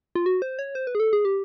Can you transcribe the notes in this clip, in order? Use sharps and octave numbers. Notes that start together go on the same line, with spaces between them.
F4
F#4
C5
C#5
C5
B4
G#4
A4
G#4
G4